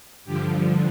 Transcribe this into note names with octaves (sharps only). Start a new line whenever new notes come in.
G2 D3 F3 G4